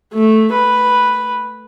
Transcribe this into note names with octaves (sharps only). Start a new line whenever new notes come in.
A3
B4